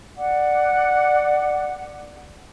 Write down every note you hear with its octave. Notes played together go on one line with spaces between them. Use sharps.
D5 F#5 D6